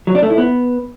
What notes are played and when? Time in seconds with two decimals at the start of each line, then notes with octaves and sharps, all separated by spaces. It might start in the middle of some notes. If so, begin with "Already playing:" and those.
0.07 F#3
0.15 D4
0.23 A3
0.30 E4
0.38 B3